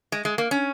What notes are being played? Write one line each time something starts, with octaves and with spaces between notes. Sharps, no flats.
G#3
G#3
A#3
C#4